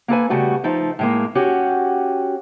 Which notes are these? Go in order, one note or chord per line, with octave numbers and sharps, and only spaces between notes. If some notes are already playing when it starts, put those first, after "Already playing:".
A#3 A4 B4 G#5
C#3 G3 A3 F#4
F3 A3 D#4
A2 G#3 A#3
C#4 F#4 G4